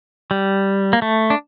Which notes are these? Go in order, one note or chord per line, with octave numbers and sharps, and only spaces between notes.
G3
A#3
A3
D4